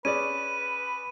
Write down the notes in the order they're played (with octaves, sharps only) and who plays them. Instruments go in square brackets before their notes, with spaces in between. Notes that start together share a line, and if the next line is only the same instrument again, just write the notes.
[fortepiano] C#4 G#4 D5 [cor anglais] B4 [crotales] D#7